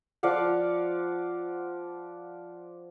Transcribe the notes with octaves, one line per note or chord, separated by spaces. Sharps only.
F3 D5 F5 F#5